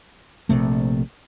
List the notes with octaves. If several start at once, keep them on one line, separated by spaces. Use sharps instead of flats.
A#1 C3 A3